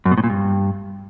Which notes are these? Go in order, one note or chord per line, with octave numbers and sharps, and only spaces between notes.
F#2
B2
A2
A#2
G2